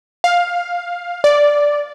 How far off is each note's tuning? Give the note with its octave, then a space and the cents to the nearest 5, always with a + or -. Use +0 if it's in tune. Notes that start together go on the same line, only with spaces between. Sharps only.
F5 +10
D5 -5